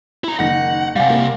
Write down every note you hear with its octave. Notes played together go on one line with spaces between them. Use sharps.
E4 A#5
F#1 D#3 F#5 A#6
C3 G3 F5 F#5 G#5
A#3